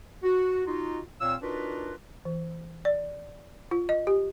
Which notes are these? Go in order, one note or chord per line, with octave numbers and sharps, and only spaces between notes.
F#4
D#4 F4 F#4
A#2 C4 C#5 F5 E6
D4 D#4 F4 F#4 A#4 B4
E3
D5
F4
D#5
G4